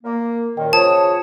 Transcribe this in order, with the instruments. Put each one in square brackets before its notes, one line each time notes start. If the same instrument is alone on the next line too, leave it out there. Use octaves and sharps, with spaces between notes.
[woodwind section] A#3
[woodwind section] F#2 A#2 D#3 [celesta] A#4 D#5 G5
[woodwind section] C#3 C#5 [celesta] F4 C5 D#6 [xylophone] A5